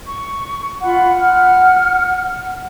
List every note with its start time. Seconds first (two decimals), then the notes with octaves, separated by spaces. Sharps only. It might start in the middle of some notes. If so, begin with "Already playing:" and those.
0.06 C#6
0.82 F4 F#5 B5
1.20 F#5 F6